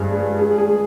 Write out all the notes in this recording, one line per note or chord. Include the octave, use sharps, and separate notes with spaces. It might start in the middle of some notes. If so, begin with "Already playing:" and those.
Already playing: G2 F3 G#3 G#4
G#3
G#3 G#4
G#4
G#3